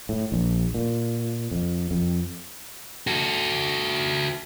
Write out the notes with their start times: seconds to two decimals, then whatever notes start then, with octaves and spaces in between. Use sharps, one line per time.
0.09 A2
0.32 A#1
0.74 A#2
1.51 F2
1.91 F2
3.07 F#4 A4